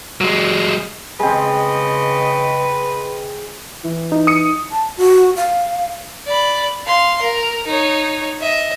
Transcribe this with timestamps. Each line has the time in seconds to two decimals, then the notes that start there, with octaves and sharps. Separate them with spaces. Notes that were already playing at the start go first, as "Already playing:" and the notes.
0.21 F#3 G#3
1.20 C#3 G#3 C4 B4 D#5
3.84 E3
4.12 D#4
4.27 D#6 C#7
4.71 A5
4.97 F#4
5.36 F5
6.27 D5 B5
6.86 F5 C6
7.22 A#4
7.67 D#4 C#5
8.41 D#5 E5